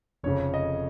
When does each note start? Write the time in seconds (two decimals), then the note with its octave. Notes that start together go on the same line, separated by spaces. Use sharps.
0.23 F1 F2 C#3 C#5
0.54 D#5